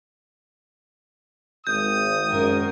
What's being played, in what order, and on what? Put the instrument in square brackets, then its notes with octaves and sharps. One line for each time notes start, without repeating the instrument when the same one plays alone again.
[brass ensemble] G#1 [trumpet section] D#6 [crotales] G6
[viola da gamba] F#2 A#4